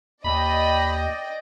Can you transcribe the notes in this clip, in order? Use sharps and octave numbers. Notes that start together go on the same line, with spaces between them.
D#2 D5 D#5 G5 B5